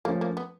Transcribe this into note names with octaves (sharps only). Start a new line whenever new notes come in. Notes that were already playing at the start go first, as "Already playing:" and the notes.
F3 A3 A#3 C#4
A#3
B3